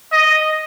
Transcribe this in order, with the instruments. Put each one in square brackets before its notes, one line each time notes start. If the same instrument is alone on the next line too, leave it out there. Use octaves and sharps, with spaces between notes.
[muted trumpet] D#5